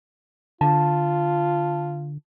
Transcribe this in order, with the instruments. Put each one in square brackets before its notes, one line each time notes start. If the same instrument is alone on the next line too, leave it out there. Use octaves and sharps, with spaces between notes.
[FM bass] D3 [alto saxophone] F4 [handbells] A5